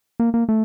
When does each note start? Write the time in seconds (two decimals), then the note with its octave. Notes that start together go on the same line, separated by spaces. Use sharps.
0.20 A#3
0.34 A#3
0.49 A3